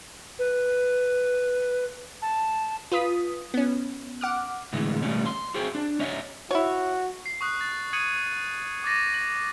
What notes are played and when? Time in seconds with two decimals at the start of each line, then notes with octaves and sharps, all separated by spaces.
0.39 B4
2.22 A5
2.92 F4 B4 D#6 B6
3.54 B3 C#4
4.21 F#5 D6 F6
4.73 A2 D3 E3 G#3
5.02 B2 D#3 G3 A3 C#4
5.26 C6
5.54 F#4 G#4 C5 G5
5.75 D4
5.99 C#4 C#5 D#5 E5
6.51 E4 F#4 C#5
7.26 C7
7.41 C#6 D#6 F#6
7.61 A6
7.93 D#6 G#6 C#7 D#7 F#7
8.84 D6 A6 A#6 D#7
9.14 F#7